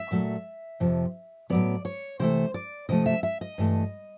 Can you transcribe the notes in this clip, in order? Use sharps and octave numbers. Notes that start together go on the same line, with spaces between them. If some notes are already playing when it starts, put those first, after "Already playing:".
Already playing: E5
A#2 F#3 A3
F2 C3 F3
A2 F#3 B3 D5
C#5
C3 E3 A3 C5
D5
C3 F3 A3 D#5
E5
E5
D#5
G2 E3 A3